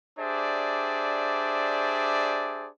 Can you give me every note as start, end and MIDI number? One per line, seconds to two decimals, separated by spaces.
0.18 2.68 62
0.18 2.68 67
0.18 2.68 68
0.18 2.68 72
0.18 2.68 74
0.18 2.68 76